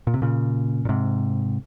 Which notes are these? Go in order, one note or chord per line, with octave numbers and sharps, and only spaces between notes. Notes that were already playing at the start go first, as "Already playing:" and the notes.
A#2
C3
A#2 C#3
A#2
G#2 C3